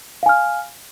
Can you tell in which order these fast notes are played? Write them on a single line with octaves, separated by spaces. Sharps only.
F5 G#5 F6